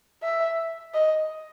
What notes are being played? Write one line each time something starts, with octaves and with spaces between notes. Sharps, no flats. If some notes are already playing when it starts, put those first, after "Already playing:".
E5
D#5